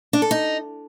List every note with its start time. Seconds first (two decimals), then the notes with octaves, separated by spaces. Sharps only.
0.13 D4
0.22 A4
0.31 D#4